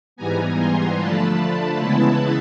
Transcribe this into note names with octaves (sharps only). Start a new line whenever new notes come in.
G#2 E3 G3 B3 G#5 A#5
A#5 C6
D3 F3 A3 D4 F4 A5 B5
C#3 E3 G#3 B3 E4 A5 B5